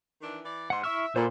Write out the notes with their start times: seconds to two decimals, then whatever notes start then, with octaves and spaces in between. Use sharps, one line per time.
0.22 D#3 E3 D4
0.45 E3 D5
0.70 G#2 F#5 C6
0.83 E4 E5 C#6 F6
1.16 A#2 D3 C5 B5 C6